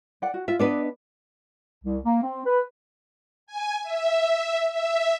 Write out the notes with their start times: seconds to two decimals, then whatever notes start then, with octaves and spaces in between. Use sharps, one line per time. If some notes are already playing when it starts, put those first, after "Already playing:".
0.22 D5 F#5
0.34 F#4
0.48 F4 E5
0.59 B3 D4 B4 D5 D#5
1.84 C2
2.05 A#3
2.23 C4
2.46 B4
3.47 G#5
3.83 E5
4.72 E5